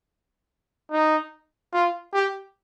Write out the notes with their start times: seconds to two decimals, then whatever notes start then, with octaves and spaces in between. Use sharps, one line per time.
0.92 D#4
1.73 F4
2.14 G4